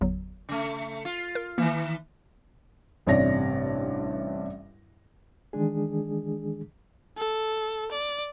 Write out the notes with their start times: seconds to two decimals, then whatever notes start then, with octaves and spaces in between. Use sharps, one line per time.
0.01 G1 E2 F#3
0.49 C#3 A3
1.05 F4
1.35 A#4
1.58 D#3 E3 A#3
3.07 A1 G2 C3 C#5 D5 A#6
5.53 D#3 E3 G#3 D4 G#4
7.17 A4
7.91 D5